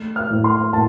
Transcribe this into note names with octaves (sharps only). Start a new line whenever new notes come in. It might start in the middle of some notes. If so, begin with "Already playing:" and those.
Already playing: A3
F6
A2
C6
A2 A5